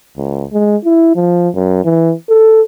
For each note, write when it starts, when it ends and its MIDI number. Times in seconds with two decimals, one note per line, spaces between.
0.17 0.44 37
0.53 0.76 56
0.85 1.14 64
1.16 1.49 53
1.55 1.84 42
1.85 2.14 52
2.29 2.62 69